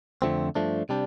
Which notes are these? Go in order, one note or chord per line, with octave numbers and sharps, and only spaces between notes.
F2 D3 F3 A3 C4
G2 F3 A3 D4
C3 G3 D4